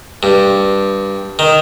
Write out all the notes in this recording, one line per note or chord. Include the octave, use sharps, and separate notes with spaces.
G2
D#3